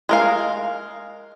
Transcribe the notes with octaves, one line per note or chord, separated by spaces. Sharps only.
G#3 A#4 F5